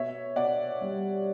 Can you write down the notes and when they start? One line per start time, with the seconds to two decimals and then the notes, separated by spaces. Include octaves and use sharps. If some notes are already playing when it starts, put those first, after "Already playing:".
Already playing: B2 C#5 E5
0.36 B2 D5 F#5
0.81 G3